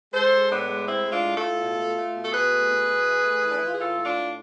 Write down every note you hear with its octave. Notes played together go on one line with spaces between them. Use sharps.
G#3 A4 C5
G#3
A2 B3 D4
G#3
A2 C4 E4
G#3
D4 F4
A2
F4 A4
A2
B2
A3
A3
B2
A4
B2 G#4 B4
A3
B2
B2
E3
A3
E3
D4
E4
E3 F4
G#4
A2 F4 A4
A2
D4 F4
A2